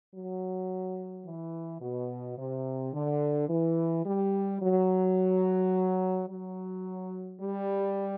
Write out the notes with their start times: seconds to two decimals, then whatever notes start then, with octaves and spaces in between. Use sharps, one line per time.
0.15 F#3
1.25 E3
1.81 B2
2.37 C3
2.93 D3
3.49 E3
4.05 G3
4.61 F#3
6.28 F#3
7.40 G3